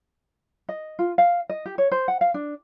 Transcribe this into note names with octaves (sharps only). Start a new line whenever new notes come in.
D#5
F4
F5
D#5
G4
C#5
C5
F#5
F5
D4